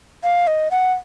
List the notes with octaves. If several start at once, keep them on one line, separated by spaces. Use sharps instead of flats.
F5
D#5
F#5